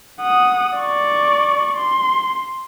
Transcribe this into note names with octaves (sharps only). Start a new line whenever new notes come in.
F#5 D#6
D5 C#6
C6